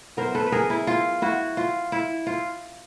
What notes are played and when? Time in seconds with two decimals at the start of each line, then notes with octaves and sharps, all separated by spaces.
0.17 F#3 B3 E4 A#4 C5
0.35 A4 B4
0.47 B4
0.52 G#4 A#4
0.70 E4
0.87 F4
1.22 E4 F#4
1.57 F4
1.92 E4
2.27 F4